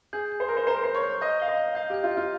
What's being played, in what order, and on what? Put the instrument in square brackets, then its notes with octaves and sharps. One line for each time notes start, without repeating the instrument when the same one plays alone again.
[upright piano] G#4 [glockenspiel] G6
[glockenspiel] G6
[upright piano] C5
[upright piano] A#4 [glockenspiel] G6
[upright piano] C5
[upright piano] C5 [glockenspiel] A#5
[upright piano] A#4
[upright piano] C5 [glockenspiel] G6
[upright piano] C#5
[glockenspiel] G6
[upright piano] D#5 [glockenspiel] G6
[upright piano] F5 [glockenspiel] G7
[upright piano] D#5
[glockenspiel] G6
[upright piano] F5 [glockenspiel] G6
[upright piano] G4 [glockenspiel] G6
[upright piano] F4
[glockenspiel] G6
[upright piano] F4